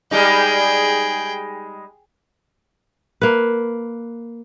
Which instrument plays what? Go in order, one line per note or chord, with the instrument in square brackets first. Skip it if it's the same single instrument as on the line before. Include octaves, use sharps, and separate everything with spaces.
[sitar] G3 G#3 D#4 [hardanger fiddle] G#4 G5
[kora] A#3 B4